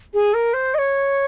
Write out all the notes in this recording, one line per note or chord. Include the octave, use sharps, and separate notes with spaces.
G#4
A#4
C5
D#5
C#5